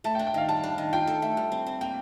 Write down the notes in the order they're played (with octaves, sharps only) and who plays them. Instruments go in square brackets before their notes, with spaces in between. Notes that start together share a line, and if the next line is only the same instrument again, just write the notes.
[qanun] A3 [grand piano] A5
[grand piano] G5
[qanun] D4
[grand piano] G5
[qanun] D#3 [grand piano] F5
[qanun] G3 [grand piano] A5
[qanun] D4
D#3
[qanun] F4 [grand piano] G5
[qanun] A4
A3
G3
C4
C4
[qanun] A#3 [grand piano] G5